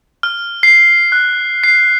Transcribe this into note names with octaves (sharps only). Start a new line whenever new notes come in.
F6
C7
F#6
C7